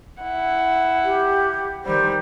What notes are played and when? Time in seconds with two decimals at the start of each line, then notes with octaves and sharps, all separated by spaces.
0.20 E4 F#5
1.05 G4
1.85 D#3 G3 C5